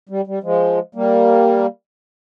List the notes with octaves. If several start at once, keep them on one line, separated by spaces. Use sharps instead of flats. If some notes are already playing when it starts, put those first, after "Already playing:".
G3
G3
F3 G#3
G3 A#3